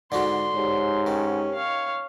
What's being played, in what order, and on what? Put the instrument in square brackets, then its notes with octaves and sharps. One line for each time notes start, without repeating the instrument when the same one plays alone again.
[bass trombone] G#2 [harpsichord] D3 D4 F#4 [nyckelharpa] C6
[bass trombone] G#2 [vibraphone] G4 C#5
[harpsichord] D#3 [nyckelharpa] C#4
[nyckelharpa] C#5 F5